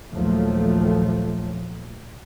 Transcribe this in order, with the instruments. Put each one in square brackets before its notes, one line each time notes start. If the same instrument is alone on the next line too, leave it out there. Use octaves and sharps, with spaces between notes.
[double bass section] A#1 D#2 F3 F#3 A3